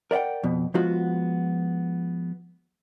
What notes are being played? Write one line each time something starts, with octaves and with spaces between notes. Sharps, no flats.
A#4 D5 E5 F#5 G5
F2 B2
F3 G#3 B3 F4 F#4